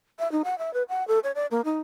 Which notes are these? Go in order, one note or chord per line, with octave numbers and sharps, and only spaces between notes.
E5
D#4
F#5
E5
B4
F#5
A4
C#5
D5
A#3
D#4